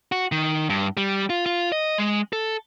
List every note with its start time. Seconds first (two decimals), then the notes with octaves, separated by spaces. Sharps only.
0.12 F#4
0.32 D#3
0.69 G2
0.97 G3
1.30 F4
1.46 F4
1.72 D#5
1.98 G#3
2.33 A4